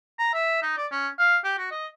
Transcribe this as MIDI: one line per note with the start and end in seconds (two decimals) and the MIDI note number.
0.19 0.31 82
0.34 0.58 76
0.62 0.75 63
0.78 0.86 74
0.91 1.08 61
1.19 1.37 77
1.44 1.53 67
1.58 1.66 66
1.71 1.87 75